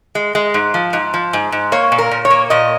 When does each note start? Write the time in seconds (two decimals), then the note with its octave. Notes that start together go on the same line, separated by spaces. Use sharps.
0.15 G#3
0.35 G#3
0.54 G#2
0.74 F3
0.93 G#2
1.14 F3
1.33 G#2
1.52 G#2
1.72 A#3 C#5
1.92 A#2
1.98 A#4
2.11 A#2
2.25 C#5
2.31 A#3
2.50 A#2 D#5